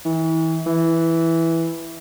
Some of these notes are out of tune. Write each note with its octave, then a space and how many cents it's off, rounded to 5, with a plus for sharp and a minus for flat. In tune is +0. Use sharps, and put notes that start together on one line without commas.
E3 -30
E3 +0